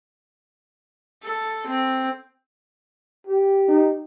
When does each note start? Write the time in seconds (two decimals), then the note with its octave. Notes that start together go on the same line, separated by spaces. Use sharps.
1.23 A4
1.66 C4
3.27 G4
3.68 D#4